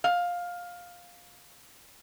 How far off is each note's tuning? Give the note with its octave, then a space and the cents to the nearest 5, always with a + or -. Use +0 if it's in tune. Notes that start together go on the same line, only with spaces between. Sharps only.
F5 +15